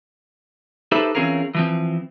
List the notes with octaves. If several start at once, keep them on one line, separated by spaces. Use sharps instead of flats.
D#4 G4 A4 B4 C5 E5
E3 C4 C#4 F4 G#4 A#4
E3 F3 C4